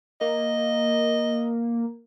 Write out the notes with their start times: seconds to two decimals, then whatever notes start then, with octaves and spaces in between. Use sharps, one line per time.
0.21 A#3 D#5